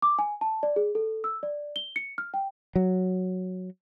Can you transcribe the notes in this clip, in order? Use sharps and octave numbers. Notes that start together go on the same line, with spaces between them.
D6
G#5
A5
D5
G#4
A4
E6
D5
G7
C#7
F6
G5
F#3